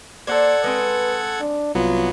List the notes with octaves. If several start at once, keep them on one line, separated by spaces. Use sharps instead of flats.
A#3 A4 C5 D5 F#5 G#6
G#3 C4 B4
D4
C2 F#3 B3 F4